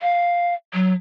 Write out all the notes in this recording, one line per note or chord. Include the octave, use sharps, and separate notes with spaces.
F5
F#3